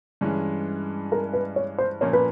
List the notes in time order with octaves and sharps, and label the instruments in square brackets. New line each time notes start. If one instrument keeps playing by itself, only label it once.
[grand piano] G2 E3 G#3 C#4
[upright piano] A#4
B4
C#5
C5
[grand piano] A#2 F3 A#3 C#4 [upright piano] C#5
[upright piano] B4